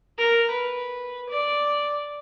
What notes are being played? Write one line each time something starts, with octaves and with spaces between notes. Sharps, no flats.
A#4
B4
D5